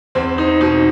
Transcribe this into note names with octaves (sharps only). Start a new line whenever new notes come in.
E2 C4
D#4
B2 D#4